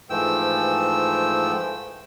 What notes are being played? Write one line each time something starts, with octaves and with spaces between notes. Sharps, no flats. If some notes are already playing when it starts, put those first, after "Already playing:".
G#2 E3 F3 A3 G5 E6